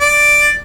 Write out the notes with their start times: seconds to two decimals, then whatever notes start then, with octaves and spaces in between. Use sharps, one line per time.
0.01 D5